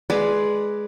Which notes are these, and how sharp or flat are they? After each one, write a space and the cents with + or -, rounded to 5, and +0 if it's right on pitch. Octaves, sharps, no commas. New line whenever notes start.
G#3 +10 B4 +0 D5 +0